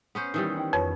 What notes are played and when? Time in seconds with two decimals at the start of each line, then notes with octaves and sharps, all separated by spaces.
0.15 B3 C#4 C5
0.34 D#3 E3 G3
0.57 D#4 G5
0.73 F2 B4 C#5